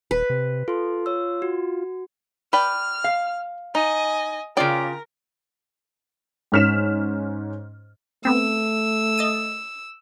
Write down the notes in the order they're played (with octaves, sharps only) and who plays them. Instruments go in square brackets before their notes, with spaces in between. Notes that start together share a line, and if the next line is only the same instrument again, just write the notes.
[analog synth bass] D#1 [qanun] B4
[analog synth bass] C3
[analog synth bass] F4 [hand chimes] A4 C6
[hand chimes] C#5 E6
F#4
[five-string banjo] B4 D5 G5 [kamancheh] F6
[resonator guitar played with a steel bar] F5
[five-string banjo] D#4 [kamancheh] D#5 G#5
[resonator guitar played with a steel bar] C#3 F4 G5 [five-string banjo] C#4 D5 [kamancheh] A#4
[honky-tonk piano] G#2 C#4 F6 B6 E7
[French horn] A3 [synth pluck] B3 C4 [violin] E6
[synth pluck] D#5 A6 D#7